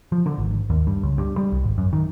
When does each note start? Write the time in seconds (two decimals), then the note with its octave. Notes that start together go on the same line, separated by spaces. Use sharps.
0.12 F3
0.26 D3
0.38 G#1
0.70 D#2
0.87 G2
1.03 C#2
1.18 G2
1.38 G3
1.52 C2
1.64 G#1
1.78 F#2
1.93 D#3